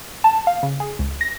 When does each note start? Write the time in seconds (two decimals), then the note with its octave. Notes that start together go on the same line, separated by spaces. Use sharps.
0.24 A5
0.47 F5
0.63 C#3
0.80 G#4
0.99 C#2
1.21 A#6